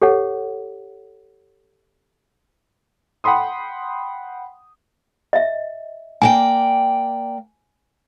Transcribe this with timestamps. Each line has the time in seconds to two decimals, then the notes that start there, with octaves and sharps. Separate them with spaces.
0.02 G4 A4 C#5 F#5
3.24 F#5 G5 B5 C6 D#6
5.33 D#5 E5
6.22 A#3 D5 G5 G#5